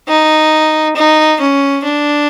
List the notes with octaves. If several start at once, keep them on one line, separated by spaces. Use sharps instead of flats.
D#4
D#4
C#4
D4